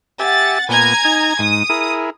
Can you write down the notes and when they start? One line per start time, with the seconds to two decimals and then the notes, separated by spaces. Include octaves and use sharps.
0.20 G4 E5 F#5 G#5 A6
0.69 A#2 B3 G#5 A#5 G#6
1.05 D#4
1.39 G#2 D#6
1.70 E4 G#4 A#4